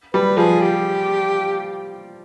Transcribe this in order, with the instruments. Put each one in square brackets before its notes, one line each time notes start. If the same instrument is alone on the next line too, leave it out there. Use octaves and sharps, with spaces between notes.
[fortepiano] G3 [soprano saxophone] B4
[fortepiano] F3 [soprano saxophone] G#4
[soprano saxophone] G4